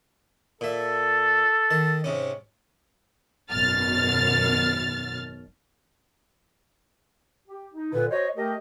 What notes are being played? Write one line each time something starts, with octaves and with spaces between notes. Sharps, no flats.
A#2 A4 E5
D#3 A5
G#2 C3 C#4
G#1 F#2 B2 F6 A6
G4
D#4
A#2 D3 B4
F#4 C5 C#5 D#5
A3 G4 A#4 D#5